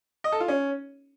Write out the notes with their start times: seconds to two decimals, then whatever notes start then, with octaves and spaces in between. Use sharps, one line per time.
0.24 D#5
0.32 A4
0.40 F4
0.48 C#4